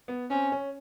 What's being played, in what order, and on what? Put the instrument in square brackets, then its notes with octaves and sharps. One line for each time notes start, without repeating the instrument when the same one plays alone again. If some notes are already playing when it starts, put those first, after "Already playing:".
[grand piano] B3
[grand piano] C4 [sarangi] C#4
[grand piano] C#4